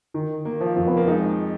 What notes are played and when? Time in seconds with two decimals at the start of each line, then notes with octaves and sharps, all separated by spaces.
0.14 D#3
0.45 A#3
0.61 F3
0.76 F2
0.87 B3
0.97 A#3
1.08 G#3 D#4